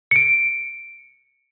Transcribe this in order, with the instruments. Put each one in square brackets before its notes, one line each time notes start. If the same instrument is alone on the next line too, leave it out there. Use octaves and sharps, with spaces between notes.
[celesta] C#7 D7